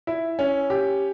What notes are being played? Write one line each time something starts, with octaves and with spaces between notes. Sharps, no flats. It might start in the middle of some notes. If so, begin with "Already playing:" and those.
E4
C#4
G4